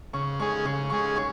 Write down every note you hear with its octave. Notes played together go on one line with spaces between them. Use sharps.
C#3 C#6
G#3 C#4 G#4 C#6
C#3 C#6
G#3 C#4 G#4 C#6
C#6